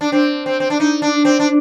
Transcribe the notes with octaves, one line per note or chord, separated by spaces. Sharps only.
D4
C4
C4
C4
D4
D#4
D4
C4
D4